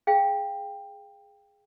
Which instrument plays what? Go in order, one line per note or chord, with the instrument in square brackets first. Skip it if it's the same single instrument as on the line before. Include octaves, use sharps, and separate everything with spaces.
[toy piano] G#4 F5 G5